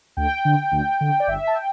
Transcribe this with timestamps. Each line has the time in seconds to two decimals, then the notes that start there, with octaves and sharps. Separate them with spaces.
0.17 D2 G5
0.45 D3
0.72 D2
1.01 D3
1.20 D5
1.27 G1 E5
1.47 A5
1.55 G5